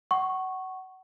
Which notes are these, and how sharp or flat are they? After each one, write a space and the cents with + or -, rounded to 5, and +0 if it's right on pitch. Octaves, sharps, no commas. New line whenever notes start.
F#5 +25 C#6 -10